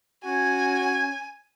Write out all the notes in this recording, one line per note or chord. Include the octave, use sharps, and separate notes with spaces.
C#4 F#4 G#5 G#6